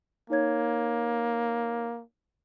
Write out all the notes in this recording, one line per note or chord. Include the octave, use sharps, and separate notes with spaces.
A#3 D#4 C#5 G#6